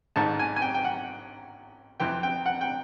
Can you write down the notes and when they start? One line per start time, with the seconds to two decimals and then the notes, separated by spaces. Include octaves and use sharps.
0.16 A1 G#2 D#3 A5
0.39 G#5
0.56 G#5
0.62 G5
0.74 G5
0.85 F#5
2.00 F2 C3 E3 G5
2.23 G5
2.46 F#5
2.61 G5